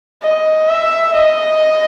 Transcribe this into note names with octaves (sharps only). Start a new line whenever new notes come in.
D#5
E5
D#5